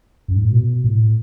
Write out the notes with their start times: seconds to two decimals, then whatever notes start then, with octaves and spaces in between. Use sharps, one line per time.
0.28 F#2
0.36 G#2
0.44 A2
0.52 B2
0.84 A2